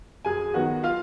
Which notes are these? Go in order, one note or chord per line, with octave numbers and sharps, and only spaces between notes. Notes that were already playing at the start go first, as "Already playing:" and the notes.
F#2 G#4 G#5
D#3 F#3 B3 F#4 F#5
F4 F5